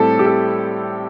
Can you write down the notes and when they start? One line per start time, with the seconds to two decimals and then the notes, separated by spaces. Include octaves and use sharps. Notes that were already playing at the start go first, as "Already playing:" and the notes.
Already playing: A2 G3 C4 E4 G4 A4
0.19 G4
0.26 A4